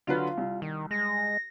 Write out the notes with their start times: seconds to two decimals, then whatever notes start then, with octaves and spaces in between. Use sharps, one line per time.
0.07 D3 F#3 F4 B4
0.38 C2
0.62 D#3
0.91 G#3 A#6